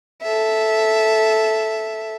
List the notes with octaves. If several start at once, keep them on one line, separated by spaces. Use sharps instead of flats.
A4 E5